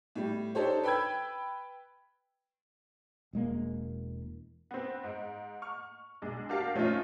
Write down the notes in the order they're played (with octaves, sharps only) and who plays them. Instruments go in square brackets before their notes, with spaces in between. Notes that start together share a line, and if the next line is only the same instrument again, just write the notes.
[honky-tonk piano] A2 G3
D4 D#4 G4 A4 C5 C#5
B4 G5 B5 E6 G#6
[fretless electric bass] E1 G#3 A#3
[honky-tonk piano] B3 C4
G#2
C#6 F6
B1 G#3 D4
D4 F#4 G4 A#4 F5 A5
F3 A3 C#4 D#4 F4